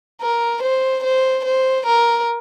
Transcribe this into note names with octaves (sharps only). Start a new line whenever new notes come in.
A#4
C5
C5
C5
A#4